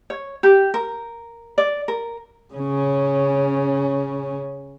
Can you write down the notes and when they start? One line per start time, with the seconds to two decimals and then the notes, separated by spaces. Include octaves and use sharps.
0.10 C#5
0.43 G4
0.74 A#4
1.58 D5
1.88 A#4
2.54 C#3 C#4